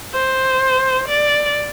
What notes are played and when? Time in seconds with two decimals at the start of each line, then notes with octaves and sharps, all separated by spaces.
0.14 C5
1.08 D5